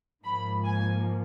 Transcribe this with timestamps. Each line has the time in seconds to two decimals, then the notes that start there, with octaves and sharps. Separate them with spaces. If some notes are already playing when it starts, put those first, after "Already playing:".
0.23 G#2 F3 A#3 B5
0.64 G#5